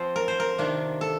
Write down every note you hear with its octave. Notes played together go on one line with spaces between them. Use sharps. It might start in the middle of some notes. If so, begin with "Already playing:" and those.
Already playing: F3 C4 F4 C5
A#4
C5
A#4
C3 D#3 A#3 D4 F4
A4